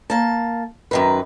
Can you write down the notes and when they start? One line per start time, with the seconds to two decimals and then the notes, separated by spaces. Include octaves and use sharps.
0.10 A#3 A5
0.91 F#2 D#3 B4